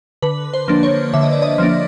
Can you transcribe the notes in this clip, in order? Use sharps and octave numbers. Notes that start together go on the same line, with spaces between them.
D3 B4
C5
F3 A#3 D4
C#5
D3 E5
D#5
D5
D#5
F3 A#3 D4